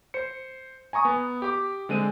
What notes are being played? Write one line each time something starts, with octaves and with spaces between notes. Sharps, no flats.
C5 C#7
G#5 A#5 C#6 D#6
B3
G4 D6
D3 G#3 C4 D#7